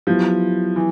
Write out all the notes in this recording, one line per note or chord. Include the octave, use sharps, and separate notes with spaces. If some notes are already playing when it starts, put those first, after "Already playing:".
F3 F#3 B3 E4 G4
E3